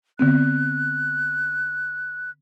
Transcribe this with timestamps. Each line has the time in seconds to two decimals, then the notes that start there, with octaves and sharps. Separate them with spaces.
0.19 D3 B3 C4 F#6